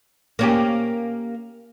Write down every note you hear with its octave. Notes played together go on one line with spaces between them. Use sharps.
A#3 C#4 G4